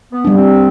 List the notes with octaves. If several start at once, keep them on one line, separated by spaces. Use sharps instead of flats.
B3
G3 D4
C4